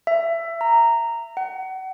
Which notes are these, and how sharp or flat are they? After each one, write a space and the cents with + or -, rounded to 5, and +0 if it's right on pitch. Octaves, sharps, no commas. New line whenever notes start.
E5 +20
A#5 -10
F#5 +35